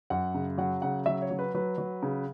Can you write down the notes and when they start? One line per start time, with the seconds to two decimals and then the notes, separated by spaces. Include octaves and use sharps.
0.10 F#2 F#5
0.35 C#3
0.58 F#3 F#5
0.82 C#3 F#5
1.06 F#3 E5
1.22 C#5
1.31 F#3
1.39 B4
1.54 F#3 B4
1.78 F#3
2.03 C#3